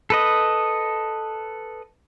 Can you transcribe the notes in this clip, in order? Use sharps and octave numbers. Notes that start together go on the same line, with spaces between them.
A4 B4 D#5